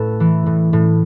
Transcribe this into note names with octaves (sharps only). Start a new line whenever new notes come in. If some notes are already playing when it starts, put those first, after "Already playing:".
Already playing: A2 A4 B4
E3
A2
A2